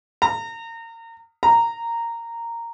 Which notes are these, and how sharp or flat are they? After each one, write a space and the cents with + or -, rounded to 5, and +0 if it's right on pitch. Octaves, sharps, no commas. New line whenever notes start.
A#5 -30
A#5 -10